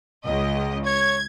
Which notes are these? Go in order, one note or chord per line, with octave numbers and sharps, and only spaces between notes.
C#2 D#5
C#5 G#6